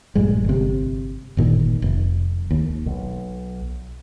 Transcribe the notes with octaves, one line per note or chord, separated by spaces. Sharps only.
A#1 G2 G#3
G1 C3
G1 A#2 D#3
F1
D#2
B1